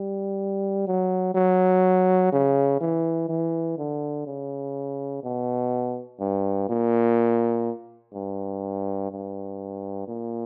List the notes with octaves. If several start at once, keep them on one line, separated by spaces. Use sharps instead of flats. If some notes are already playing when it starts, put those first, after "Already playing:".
Already playing: G3
F#3
F#3
C#3
E3
E3
D3
C#3
B2
G2
A#2
G2
G2
A#2